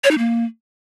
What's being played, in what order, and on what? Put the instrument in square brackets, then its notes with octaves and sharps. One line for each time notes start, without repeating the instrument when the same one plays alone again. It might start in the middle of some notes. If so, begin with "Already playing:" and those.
[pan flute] C#5
D#4
A#3